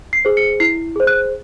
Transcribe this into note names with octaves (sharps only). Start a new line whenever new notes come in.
C7
G#4 C5
C#7
E4 C7
G#4 C5
F#6